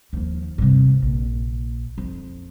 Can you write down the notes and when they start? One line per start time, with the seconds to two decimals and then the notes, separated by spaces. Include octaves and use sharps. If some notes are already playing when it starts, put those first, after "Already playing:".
0.13 D#2 F3
0.58 G2 C3
1.02 A#1
1.98 F2